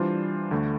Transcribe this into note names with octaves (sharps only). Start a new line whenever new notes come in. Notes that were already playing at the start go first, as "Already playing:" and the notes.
Already playing: E3 G3 D4 F4 C5
D2 D3 A3